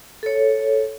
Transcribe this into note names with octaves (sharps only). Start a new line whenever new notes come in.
A4 C#5